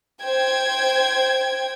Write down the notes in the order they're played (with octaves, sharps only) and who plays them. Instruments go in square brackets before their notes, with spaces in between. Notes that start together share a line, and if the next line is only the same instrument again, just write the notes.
[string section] C5 G5 G#6